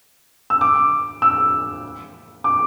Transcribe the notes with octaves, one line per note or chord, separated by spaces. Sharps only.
E6
D6
E6
D6